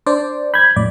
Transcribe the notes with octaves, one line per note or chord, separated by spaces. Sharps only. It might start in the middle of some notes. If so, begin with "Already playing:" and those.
D4 C5 D5
B5 G6 G#6
F2 A2 D5